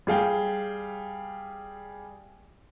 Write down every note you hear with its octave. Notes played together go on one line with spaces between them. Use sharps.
G3 G#4 F5 G5